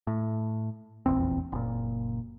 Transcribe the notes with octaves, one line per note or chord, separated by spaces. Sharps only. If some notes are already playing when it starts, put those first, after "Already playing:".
A2
F1 A#1 E2 C4
F#1 A#2